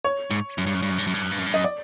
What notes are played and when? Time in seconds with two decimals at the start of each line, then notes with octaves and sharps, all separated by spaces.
0.04 C#5
0.31 G#2
0.58 F#2
0.66 G2
0.74 F#2
0.82 G2
0.91 F#2
0.98 G2
1.07 F#2
1.14 G2
1.22 F#2
1.31 G2
1.39 F#2
1.46 G2
1.54 F#2 D#5
1.64 D5